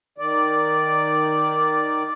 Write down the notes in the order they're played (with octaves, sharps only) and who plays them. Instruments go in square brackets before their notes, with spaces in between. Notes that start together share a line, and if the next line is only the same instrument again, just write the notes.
[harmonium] D#3 D5